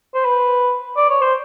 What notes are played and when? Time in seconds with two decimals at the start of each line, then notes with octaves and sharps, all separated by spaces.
0.14 C5
0.25 B4
0.96 D5
1.09 C#5
1.21 C5